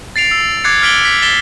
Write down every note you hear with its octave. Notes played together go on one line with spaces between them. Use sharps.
A6 C7 D7 F7
E6
D6 F#6 G#6 A6 C7 C#7
D6 F6 B6 D7 F#7 G7
B6
A6 B6 E7 G7